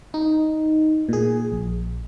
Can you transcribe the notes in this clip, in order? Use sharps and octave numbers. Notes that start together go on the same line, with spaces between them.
D#4
A#2 G#4
A#1